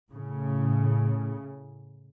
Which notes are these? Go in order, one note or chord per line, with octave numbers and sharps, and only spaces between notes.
A2 C#3